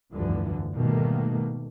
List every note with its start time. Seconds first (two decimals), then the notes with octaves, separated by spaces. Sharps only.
0.12 F1 D2 G2 D3 E3 F3
0.74 G#2 B2 D#3 G3 A3 A#3